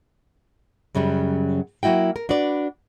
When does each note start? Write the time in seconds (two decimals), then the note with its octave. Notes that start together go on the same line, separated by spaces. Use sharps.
0.95 F#2 C#3 F#3 G3
1.83 F#3 A#3 E4 F#4 G5
2.16 A#4
2.29 D4 F#4 B4 D5